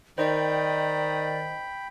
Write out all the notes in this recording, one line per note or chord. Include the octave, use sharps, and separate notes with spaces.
D#3 C5 D5 D#5 G5 B5